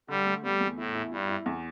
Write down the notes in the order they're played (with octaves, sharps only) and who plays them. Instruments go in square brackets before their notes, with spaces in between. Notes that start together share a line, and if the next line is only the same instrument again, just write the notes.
[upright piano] D3 [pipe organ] G3
[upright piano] A3
[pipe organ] G3 [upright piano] B3
[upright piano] E2
[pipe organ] A2 [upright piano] E4
[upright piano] E4
[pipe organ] G2 [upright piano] E4
[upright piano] E4
E2